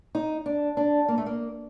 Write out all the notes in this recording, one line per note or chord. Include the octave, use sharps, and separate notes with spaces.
D#4
D4
D4
A#3
A3
A#3